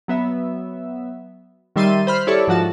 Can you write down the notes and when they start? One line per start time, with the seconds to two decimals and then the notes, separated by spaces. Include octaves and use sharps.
0.08 F#3 B3 E5
1.76 D#3 G3 E5 C6 A6 D#7
2.07 C5 B5 F6
2.27 E4 G4 A4 C#5 D5 C#6
2.47 G#2 F3 F#4 A5